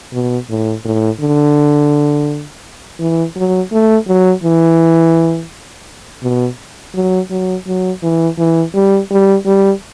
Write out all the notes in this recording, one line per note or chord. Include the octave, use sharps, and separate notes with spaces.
B2
A2
A2
D3
E3
F#3
A3
F#3
E3
B2
F#3
F#3
F#3
E3
E3
G3
G3
G3